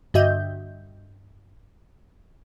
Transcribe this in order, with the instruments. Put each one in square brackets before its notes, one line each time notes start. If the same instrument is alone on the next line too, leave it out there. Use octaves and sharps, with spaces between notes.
[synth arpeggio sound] G2 D3 F#4 D#5 E5 G6